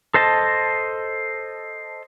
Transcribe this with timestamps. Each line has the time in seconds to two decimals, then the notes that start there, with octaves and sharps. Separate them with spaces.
0.14 A4 C5 D#5 A5